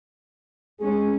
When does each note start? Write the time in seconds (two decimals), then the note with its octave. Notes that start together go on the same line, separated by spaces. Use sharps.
0.80 G#3 C#4 G#4